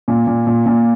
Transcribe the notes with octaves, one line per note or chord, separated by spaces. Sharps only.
A#2
A#2
A#2
A#2